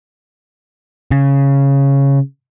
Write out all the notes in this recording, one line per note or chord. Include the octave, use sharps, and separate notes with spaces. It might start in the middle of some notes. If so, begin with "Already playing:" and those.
C#3